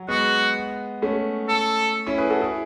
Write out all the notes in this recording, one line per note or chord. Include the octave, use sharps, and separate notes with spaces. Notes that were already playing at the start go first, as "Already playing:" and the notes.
Already playing: F#3
G#3 B3 F#4
A3 C#4
A4
C#4 E4
G#4 B4
F#4 A4
E4 G#4